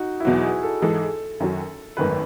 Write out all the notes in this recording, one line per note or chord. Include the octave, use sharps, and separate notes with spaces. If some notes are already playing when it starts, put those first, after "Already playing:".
Already playing: D#4 F#4
E4
E2 B2 F#3 F#4
G#4
A4
G#2 E3 G#3 D#4 G#4 A4
F#2 D#3 F#3 C#4 F#4
G#1 F#2 D#3 A3 B4